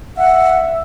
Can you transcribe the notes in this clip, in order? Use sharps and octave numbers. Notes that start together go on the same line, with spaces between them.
E5 F#5